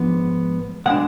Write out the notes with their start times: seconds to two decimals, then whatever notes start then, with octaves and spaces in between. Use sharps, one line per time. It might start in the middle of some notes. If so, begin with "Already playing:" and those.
Already playing: G#2 F3 G#3 B3 D4
0.86 B2 G#3 D4 F#5